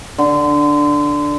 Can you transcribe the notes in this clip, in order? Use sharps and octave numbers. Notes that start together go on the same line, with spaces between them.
D3